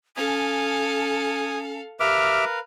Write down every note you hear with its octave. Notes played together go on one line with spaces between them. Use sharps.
C#4 A4 F5 G#5 D#6
G4 A#4 B4 E5 F5 D6 F6